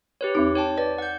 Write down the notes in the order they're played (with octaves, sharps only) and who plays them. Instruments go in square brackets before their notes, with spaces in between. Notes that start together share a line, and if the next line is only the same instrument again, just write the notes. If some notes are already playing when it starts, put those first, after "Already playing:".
[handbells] G4 B4 C#5
[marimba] E2 C4 D#4
[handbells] C#5 G5 A5
[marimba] B4 [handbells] D5
[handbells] F#5 G6